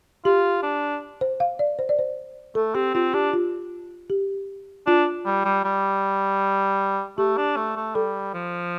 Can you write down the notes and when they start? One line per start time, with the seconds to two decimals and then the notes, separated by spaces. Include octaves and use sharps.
0.25 F4 G4
0.63 D4
1.21 C5
1.40 F5
1.59 D5
1.79 C5
1.89 D5
1.99 C5
2.55 A3 A4
2.75 C4 G4
2.94 C4 F4
3.14 D4 G4
3.33 F4
4.10 G4
4.87 D4 F4
5.26 G3
5.45 G3
5.64 G3
7.18 A3 G4
7.37 D4
7.56 A3
7.76 A3
7.95 G3 A4
8.34 F3